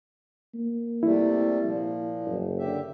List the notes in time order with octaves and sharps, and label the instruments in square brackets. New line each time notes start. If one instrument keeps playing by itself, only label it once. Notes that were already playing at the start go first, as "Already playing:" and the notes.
[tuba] A#3
[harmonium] C3 G3 A3 [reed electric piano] E4
[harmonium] A#2 F3
[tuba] F#1
[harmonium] D3 G4 E5